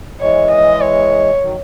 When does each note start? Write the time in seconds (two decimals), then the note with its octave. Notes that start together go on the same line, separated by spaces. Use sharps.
0.20 E3 G#3 C#5
0.50 D#5
0.81 C#5
1.42 D#3 F#3